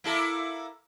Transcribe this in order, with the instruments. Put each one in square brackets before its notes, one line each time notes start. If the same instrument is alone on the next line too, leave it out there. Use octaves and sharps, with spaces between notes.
[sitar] A#3 E4 A4